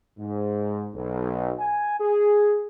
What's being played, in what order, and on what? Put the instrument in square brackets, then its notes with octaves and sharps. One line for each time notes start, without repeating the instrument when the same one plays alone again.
[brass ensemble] G#2
B1
G#5
G#4